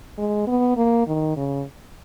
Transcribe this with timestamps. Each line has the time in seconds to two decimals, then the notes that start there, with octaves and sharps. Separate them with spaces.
0.18 G#3
0.47 B3
0.77 A#3
1.07 D#3
1.37 C#3